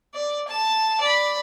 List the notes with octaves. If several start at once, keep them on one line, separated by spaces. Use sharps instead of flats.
D5
A5
D5 B5